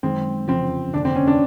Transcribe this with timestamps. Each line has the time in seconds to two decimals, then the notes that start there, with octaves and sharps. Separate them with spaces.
0.03 F#2 D#3 G#3 C4
0.48 F1 E2 C#3 F3 C4
0.93 F1 D#2 D3 D4
1.05 C4
1.16 C#4
1.27 D4